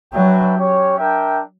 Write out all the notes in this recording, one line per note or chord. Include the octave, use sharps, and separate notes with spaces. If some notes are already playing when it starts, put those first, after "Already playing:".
F#3 D4 F#4 B4 E5 G5
C#4 G4 C#5
D4 A#4 E5 G5